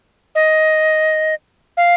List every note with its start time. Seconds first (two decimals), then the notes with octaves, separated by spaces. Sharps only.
0.35 D#5
1.77 F5